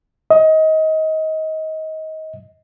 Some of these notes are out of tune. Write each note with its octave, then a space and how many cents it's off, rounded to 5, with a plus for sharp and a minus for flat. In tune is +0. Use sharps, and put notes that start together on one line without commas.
D#5 +25